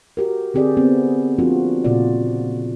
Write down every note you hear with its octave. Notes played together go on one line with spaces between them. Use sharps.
F#4 G4 A#4
D3 C4 G4 G#4 D5
B3 C4
F3 A#3 C4 D4 F4 F#4
A#2 C#3 F4 F#4 D5